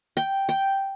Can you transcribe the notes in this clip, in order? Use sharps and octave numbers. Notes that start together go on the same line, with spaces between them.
G5
G5